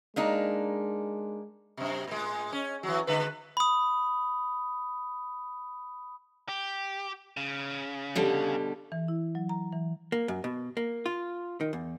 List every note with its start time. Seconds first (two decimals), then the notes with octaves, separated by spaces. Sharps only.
0.16 G#3 A#3 D4 D#4
1.77 F#2 C3
2.07 A2 G#3
2.52 C#4
2.83 E3 F#3
3.07 D3 G#3 B4
3.57 B5 D#6
6.49 G4
7.37 C#3
8.16 B2 D3 G3
8.92 E3
9.08 E4
9.35 F#3
9.49 A#5
9.72 E3
10.12 A#3
10.28 F#2
10.44 B2
10.77 A#3
11.06 F4
11.61 D#3
11.73 E2